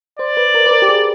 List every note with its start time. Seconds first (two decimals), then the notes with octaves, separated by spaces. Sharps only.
0.19 C5 D5
0.37 B4
0.54 A#4
0.66 B4
0.71 A#4
0.82 G4
0.89 G#4